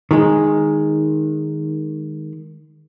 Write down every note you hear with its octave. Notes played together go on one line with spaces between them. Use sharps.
D#3 G#3